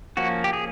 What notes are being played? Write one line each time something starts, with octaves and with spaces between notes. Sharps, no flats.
F3 A#3 C#4 F#4
G4
G#4